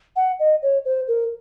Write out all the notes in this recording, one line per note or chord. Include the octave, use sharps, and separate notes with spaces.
F#5
D#5
C#5
C5
A#4